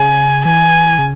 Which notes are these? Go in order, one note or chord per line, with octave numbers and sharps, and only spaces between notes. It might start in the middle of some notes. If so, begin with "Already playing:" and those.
Already playing: C#3 G#5
E3 G#5
C#3